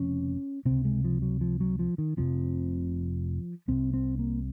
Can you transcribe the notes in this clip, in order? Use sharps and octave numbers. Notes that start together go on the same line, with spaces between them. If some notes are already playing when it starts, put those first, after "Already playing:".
Already playing: F1 F2 C#3 C#4
C#2 C3 C4
G#3
F3
F#3
F3
F#3
F3
D#3
F1 F2 C3 F3
C2 C3 C4
C4
A#3